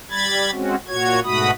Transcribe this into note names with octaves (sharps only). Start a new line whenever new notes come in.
G3 B5 G#6 A6
G#3 C4 C#4 F#4
A#2 F#4 C#5 G#6
G#2 B2 A3 F#4 B5 D#6